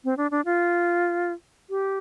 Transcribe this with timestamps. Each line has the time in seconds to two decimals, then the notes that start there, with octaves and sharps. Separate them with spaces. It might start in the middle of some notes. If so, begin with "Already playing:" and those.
0.04 C4
0.17 D4
0.31 D4
0.45 F4
1.70 G4